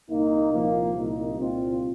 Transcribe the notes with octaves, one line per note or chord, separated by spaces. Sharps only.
C2 A#2 A#3 D#4
C2 A#2 F3 A#3
C2 A#2 A#3 D#4
C2 A#2 C4 F4